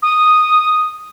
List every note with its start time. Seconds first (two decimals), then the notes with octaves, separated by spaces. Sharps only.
0.02 D#6